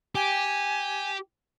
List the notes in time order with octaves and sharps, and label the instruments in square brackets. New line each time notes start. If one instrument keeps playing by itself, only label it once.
[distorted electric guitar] G4 [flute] G#5